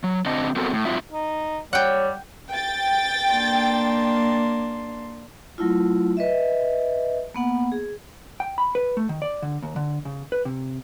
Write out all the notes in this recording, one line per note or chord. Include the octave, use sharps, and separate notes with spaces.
F#3
D3 C4 D#5
B3 C4 F#4 A4 A#4
A2
G#2 F#3 C4 F4 E5
D#4
G3 C#5 F#5 G5
G5 A6
A#3 D4 C6
F#3 A3 E4 F4
B4 D#5 E5
A#3 B3 F#5
G#4
G5
B5
B4
A3
D#3
D5
D3
D#2
D3
C#3
B4
C3